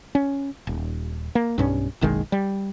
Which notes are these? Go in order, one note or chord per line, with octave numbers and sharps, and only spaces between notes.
C#4
D#1
A#3
B1 G2 C#4
F#1 B1 D#3 G#3
G3